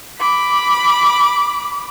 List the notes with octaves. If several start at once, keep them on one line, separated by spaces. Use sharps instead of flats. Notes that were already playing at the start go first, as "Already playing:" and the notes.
B5 D6